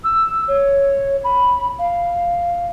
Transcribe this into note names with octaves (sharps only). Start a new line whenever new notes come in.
E6
C#5
B5
F5